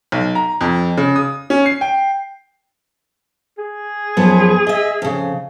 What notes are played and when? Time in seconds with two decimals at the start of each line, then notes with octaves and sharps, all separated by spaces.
0.12 B1
0.35 A#5
0.61 F2
0.97 C#3
1.16 D#6
1.50 C#4
1.66 C7
1.81 G5
3.58 G#4
4.17 F#2 F3 B3
4.67 D#5 E5
5.02 F2 C#3